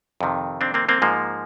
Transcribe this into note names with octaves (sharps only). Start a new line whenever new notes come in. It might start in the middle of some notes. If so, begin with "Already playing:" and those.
F2 C3 D#3
C4 D4
A#3 C4
A#3 C4
G#2 F3 G#3 A#3